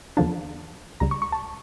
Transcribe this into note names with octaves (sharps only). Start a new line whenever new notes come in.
E2 D3 F3 A#3 D4 A5
C#2 C#3 G3 A#5
C#6
C#6
A5